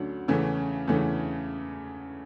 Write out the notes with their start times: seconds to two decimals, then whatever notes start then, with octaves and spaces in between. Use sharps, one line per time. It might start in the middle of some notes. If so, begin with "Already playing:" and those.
Already playing: D2 D3 F#3 C#4
0.28 E2 C#3 E3 A3 C#4
0.88 E2 C#3 E3 A3 C#4